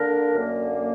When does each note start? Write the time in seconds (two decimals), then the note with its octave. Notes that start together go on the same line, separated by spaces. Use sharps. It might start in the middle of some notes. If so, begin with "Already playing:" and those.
Already playing: D3 A#3 D4 A#4
0.35 F#2 D3 A#3